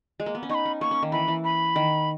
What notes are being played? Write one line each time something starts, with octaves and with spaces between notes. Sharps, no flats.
G#3
A#3
B3
C#4
D#4 C#6
B5
C#4
A#3 C#6
C#4
D#3
E3 B5
E3
B5
D#3